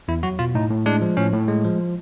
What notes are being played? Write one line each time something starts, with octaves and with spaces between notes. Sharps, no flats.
E2 E4
F#3 F#4
B2 F4
A2 D#4
A2
G#3 D4
F3
A2 C#4
A2
G#3
F3